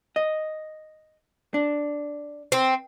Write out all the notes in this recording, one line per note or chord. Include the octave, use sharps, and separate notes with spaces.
D#5
D4
C4